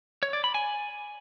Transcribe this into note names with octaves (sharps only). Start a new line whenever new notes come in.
C#5
D5
B5
G#5